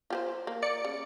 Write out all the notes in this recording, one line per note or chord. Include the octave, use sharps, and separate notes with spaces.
F4 G4 C5
A#3
D5 C#7
C#3